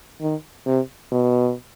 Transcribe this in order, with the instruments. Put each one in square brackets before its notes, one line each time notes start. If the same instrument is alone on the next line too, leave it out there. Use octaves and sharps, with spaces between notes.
[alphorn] D#3
C3
B2